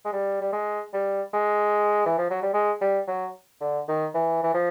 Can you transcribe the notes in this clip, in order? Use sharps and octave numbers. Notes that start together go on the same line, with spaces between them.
G#3
G3
G3
G#3
G3
G#3
E3
F3
F#3
G3
G#3
G3
F#3
D3
D#3
E3
E3
F3